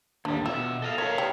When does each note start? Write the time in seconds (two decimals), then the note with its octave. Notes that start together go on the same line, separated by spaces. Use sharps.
0.25 D#2 D3 G3 D4
0.46 B2 F4 E5
0.82 A4 D#5 F5
0.98 A#3 C#5 E5 F5
1.18 G3 G5